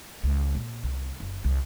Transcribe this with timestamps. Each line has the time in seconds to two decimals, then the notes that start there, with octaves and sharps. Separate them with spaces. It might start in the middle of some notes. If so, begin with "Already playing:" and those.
0.24 C#2
0.55 A#2
0.83 C2
1.20 F#1
1.44 C2